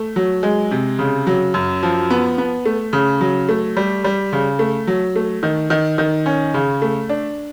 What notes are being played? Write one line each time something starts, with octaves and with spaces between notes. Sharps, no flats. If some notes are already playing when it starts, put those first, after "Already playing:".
Already playing: A3
F#3
G#3
C3
C#3
F#3
F#2
F3
B3
B3
A3
C#3
F#3
A3
G3
G3
C#3
A3
F#3
A3
D#3
D#3
D#3
C#4
C#3
A3
D4